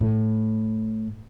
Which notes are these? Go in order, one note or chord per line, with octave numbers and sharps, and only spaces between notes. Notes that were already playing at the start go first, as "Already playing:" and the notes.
A2